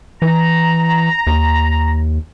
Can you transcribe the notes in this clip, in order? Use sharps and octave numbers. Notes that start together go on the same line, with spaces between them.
E3 A#5
D#2